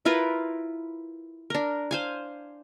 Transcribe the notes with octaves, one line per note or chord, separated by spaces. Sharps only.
E4 F4 A#4 B4
D4 A#4
C5 F5 G#5